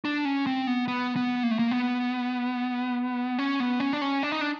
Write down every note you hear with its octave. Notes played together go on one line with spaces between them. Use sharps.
D4
C#4
C4
B3
B3
B3
A#3
A3
A#3
B3
C#4
B3
C#4
D4
C#4
D4
D#4
D4